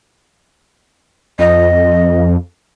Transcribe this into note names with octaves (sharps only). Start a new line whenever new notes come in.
F2 D#5